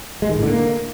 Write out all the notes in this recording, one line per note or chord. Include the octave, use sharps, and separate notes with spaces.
G#3
D#3
A2
D3
A#3